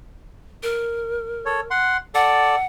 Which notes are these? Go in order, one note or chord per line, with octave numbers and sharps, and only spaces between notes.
A#4
A4 C#5
F#5 C6
A4 D5 F#5